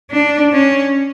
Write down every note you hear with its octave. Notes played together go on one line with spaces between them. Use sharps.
D4
C#4